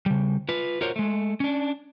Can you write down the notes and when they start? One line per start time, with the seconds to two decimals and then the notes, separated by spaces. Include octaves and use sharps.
0.06 C#3 G3
0.49 F4 B4
0.81 F4 F#4 A#4 C5 C#5
0.96 G#3 A3
1.40 C#4 D4